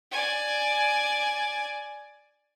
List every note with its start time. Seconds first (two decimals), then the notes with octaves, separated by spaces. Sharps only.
0.12 D5 G#5